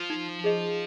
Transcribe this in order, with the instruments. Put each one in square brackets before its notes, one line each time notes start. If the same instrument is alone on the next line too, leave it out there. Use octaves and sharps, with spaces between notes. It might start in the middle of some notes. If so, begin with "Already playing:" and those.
Already playing: [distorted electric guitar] F3
[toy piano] D#4
G#4 D#5